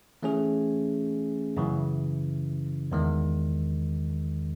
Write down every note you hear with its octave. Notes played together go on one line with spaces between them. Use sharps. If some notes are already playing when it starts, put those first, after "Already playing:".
E3 A3 C#4 G#4
F#2 C#3 E3
E2 D#3 G#3